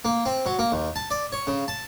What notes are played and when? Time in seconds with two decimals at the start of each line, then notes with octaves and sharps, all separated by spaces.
0.05 A#3
0.26 C4
0.46 F#3
0.59 A#3
0.72 D#2
0.96 A5
1.11 D5
1.32 C#5
1.47 C#3
1.68 A5